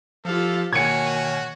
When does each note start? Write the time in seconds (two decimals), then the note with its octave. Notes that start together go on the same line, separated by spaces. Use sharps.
0.25 F3 F4 G4 A4 F5
0.73 B2 D#3 A#3 F#4 C#5 G#5 G#6 C#7